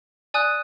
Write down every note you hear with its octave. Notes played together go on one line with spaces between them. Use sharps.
D5 G#5 D#6 F#6